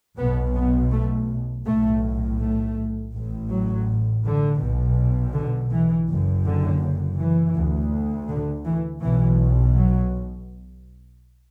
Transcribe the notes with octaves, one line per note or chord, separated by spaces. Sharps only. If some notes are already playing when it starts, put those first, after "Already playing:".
B1 B2 B3
B3
A3
B1 A2 A3
A3
A1 A2
F#3
D3
B1 B2
D3
E3
F#1 F#2
D3
E3
D2
D3
E3
B1 B2 E3
F#3